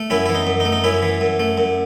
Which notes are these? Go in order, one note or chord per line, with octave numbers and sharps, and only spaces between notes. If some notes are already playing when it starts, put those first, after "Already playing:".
Already playing: A3
F#2 C#4 E4
E3 E4
D#4
F#2
D#4
A3
D#4
F#2 C#4 E4
E3
F#2
A3
F#2